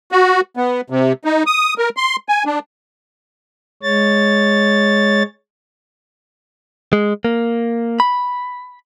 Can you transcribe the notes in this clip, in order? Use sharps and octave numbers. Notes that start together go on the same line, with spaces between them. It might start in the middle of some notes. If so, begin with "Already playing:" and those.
F#4
B3
C3
D#4
D#6
A#4
C6
G#5
D4
G#3 C#5 A6
G#3
A#3
B5